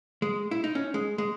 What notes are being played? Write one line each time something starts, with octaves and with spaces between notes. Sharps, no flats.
G#3
E4
D#4
C#4
G#3
G#3